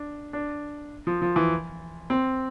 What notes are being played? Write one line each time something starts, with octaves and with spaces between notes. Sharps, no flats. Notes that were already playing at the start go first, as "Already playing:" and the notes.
Already playing: D4
D4
F3
F3
E3
C4